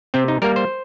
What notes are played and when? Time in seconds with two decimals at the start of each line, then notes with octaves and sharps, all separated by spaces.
0.14 C3 C4
0.28 D#4
0.42 G3 A#3 A#4
0.56 C5